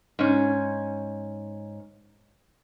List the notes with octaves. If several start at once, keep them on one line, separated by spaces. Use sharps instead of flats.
G#2 C#4